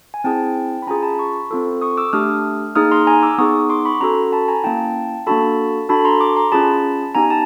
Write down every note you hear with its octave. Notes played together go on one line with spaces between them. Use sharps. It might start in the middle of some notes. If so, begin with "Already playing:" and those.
G#5
C4 E4 G#4 G5 A5
B5
C#4 F4 G#4 G#5 A#5
A5 B5
B5 C#6
C4 F4 A4
C#6 D#6
D6 E6
A3 D4 G4 D#6 F6
A#3 D#4 G#4 D#6 F6
A#5 C6
G#5 A#5
D6 E6
B3 D#4 G#4 C#6 D#6
C6 D6
B5 C#6
C#4 F#4 A4 A#5 C6
A5 B5
G#5 A#5
A#3 C#4 E4 G5 A5
A#3 D4 F#4 A4 A5 B5
D4 F#4 A4 A5 B5
A#5 C6
C6 D6
A#5 C6
C#4 F4 G#4 A5 B5
B3 D#4 G4 G#5 A#5
A5